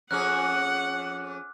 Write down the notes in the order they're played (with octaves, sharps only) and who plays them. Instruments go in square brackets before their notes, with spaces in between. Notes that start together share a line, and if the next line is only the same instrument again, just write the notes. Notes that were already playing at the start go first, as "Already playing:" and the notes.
[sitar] F2 C#4 G#4 [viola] F#5 [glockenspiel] D6 F6 F#6